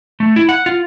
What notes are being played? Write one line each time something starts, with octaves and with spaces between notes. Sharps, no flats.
A3
E4
F#5
F4